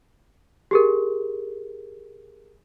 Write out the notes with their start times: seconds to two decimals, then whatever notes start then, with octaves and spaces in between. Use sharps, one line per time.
0.71 G4 G#4 A#4